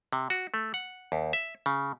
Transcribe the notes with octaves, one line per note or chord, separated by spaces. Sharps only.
C3
F#4
A3
F#5
D#2
E5
C#3